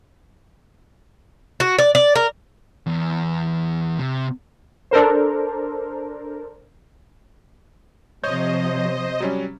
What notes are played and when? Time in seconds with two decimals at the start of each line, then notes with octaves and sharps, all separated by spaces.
1.60 F#4
1.79 D5
1.95 D5
2.16 A#4
2.87 E2
3.99 C3
4.91 D4 A4 A#4 C5
8.24 C3 F3 C5 C#5 D#5 G6
9.20 F#3 G3 C#4